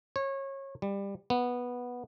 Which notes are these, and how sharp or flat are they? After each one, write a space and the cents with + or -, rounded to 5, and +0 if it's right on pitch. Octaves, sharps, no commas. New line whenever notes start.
C#5 -25
G3 +20
B3 -10